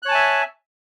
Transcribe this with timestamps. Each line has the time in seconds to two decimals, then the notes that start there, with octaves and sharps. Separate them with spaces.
0.03 F#6
0.06 C#5
0.08 A5
0.11 G#5
0.14 E5